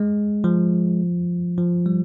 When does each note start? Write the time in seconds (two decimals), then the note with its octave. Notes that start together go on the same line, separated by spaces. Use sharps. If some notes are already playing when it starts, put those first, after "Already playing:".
Already playing: G#3
0.44 F3
1.58 F3
1.86 G3